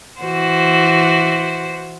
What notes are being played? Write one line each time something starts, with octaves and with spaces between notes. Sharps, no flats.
E3 F#4 C5